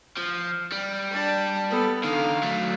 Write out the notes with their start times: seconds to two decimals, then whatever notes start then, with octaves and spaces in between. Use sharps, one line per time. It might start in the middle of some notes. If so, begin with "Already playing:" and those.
0.18 F3
0.73 G3
1.11 D4 A5
1.70 B3 A4
2.03 D3 D#3 F5
2.42 F#3 A3